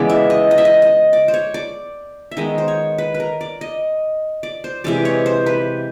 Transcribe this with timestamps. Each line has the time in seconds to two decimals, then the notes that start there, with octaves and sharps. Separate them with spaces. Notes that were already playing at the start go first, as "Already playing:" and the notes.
Already playing: C#3 E3 G#3 B3 D5
0.10 E5
0.30 D#5
0.51 D#5
0.58 E5
0.65 D#5
0.82 D#5
1.13 D5
1.28 C5
1.34 C#5
1.54 D5
2.31 E5
2.37 D#3 G#3 B3 D#5
2.58 C5
2.68 C#5
2.98 B4
3.14 B4
3.20 A#4
3.41 D5
3.61 D#5
4.43 D5
4.64 C5
4.84 C3 E3 G#3 D5
5.05 C#5
5.26 C5
5.46 B4